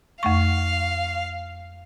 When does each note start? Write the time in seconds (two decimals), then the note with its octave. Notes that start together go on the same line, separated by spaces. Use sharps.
0.23 F2 A3 F5 C#6